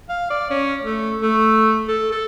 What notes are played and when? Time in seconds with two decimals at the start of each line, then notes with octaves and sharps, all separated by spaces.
0.09 F5
0.30 D5
0.50 C#4
0.82 A3
1.22 A3
1.88 A4
2.12 A4